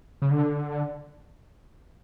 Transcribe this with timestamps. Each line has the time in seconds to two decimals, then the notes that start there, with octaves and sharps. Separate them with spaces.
0.22 C#3
0.31 D3